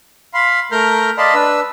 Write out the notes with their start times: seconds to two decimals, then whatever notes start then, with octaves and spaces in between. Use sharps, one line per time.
0.34 F5 B5 C6
0.72 A3 A#4 A#5 F6 G6
1.18 D5 D#5 F5 A5 B5 C6
1.34 D4 B4 E6